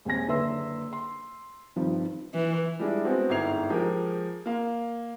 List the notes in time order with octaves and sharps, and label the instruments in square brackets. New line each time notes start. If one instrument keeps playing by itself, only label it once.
[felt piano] D#1 G#3 C4 G#5 A#6
F#1 D3 B4 E5 C6 E6
C6
G2 D#3 F3 C4
[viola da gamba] E3
[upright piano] G3 G#3 D4 E4
G#3 B3 C4 F#4
G1 G#2 E4 G#6 C7 F7
F3 G#3 G4 A#4
A#3 F5